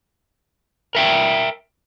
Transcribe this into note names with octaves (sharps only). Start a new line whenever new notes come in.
A#4 E5 G5